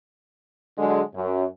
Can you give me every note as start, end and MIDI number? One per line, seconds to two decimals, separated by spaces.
0.77 1.00 50
0.77 1.00 54
0.77 1.00 56
1.14 1.43 42